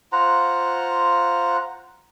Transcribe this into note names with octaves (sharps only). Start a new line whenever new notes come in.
F4 C5 F#5 A#5